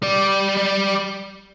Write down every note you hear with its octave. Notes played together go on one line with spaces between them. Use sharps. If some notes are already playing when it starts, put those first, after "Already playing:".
G3 D5